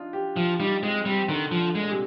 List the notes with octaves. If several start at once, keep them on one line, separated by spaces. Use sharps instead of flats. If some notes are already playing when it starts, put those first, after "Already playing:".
Already playing: D4 D#4 F4
G4
F3 F4
G3 D#4
G#3 C4
G3 C4
D3 D#3
F3
D3
G#3
A#2
C3